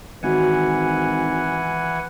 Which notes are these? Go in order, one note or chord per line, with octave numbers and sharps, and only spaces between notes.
G#1 D#3 E3 F#4 F#5 G#5